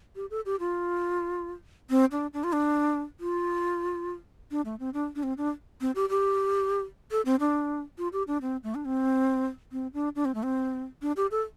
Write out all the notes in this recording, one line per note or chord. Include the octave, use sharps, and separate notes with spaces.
G4
A4
G4
F4
C4
D4
D4
F4
D4
F4
D4
A3
C4
D4
D4
C4
D4
C4
G4
G4
A4
C4
D4
F4
G4
D4
C4
A3
D4
C4
C4
D4
D4
C4
A3
C4
D4
G4
A4